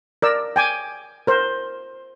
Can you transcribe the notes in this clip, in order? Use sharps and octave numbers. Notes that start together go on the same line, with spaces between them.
A#4 D5 E6
G5 G#5 D6
A#4 C5